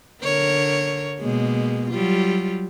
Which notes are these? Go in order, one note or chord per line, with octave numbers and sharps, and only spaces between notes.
D3 A#4 C#5
B2 G#3 A#3
F#3 G3 F4